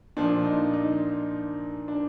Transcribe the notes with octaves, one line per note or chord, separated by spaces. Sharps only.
A#2 F3 D4
D#4
D#4
D4